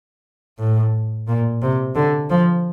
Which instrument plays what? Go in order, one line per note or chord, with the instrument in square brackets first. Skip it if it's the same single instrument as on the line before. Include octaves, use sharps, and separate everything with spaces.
[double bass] A2
A#2
C3
D3
F3